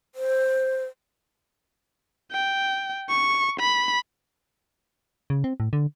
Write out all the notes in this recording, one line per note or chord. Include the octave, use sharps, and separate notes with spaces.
C5
G5
C#6
B5
C#3
C4
A2
D3